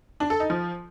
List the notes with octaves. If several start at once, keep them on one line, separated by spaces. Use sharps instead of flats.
D4
A4
D#4
F3